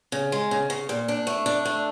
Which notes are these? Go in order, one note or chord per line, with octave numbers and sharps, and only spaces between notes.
C#3
G#3
C#3
C#3
A#2
D4
A3
D4
A3